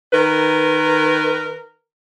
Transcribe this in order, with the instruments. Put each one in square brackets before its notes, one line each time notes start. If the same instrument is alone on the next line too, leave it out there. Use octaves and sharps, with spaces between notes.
[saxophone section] D#3 A#4 B4